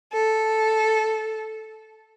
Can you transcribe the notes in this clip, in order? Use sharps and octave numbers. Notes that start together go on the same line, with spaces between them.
A4